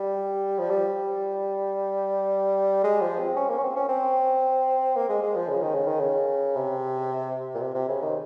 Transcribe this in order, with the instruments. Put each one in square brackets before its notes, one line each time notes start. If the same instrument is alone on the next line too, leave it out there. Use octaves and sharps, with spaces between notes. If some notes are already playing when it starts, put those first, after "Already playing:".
Already playing: [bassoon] G3
F3
G3
G#3
F3
C4
C#4
A#3
C#4
C4
C#4
C4
A#3
G#3
G#3
F3
C#3
D#3
C#3
D#3
C#3
C3
A#2
C3
C3
C#3
D#3